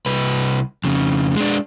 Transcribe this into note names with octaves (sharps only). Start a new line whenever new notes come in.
C2 B4
F2 C#3
G#3 D4